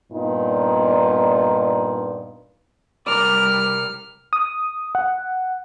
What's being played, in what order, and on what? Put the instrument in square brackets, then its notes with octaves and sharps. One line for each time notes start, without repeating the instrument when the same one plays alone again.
[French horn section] G2 A#2 B3 D#4
[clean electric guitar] C2 A#4 D5 [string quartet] G3 F6
[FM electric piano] D#6
F#5